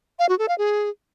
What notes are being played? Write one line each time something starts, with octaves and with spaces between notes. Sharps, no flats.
F5
F#4
A4
F5
G#4